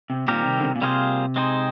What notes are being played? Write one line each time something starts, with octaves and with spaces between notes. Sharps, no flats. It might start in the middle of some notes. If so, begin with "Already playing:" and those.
C3
A#2 D#3 G3 C4 G4 A#4
C3
D3
C3
A#2
C3 G3 A#3 F4 G#4 C5
G#3 C4 D#4 G#4 C5